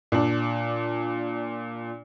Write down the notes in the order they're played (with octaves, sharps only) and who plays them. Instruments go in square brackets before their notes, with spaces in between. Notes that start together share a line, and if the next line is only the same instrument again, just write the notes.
[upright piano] A#2 D4